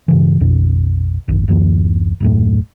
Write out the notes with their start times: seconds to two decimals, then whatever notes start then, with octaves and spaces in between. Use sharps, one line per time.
0.08 G2 C#3 E3
0.40 A#1 F2 B2
1.28 D1 G#1 F#2
1.48 D1 F#2 E3 A#3
2.20 D#1 F#2 A2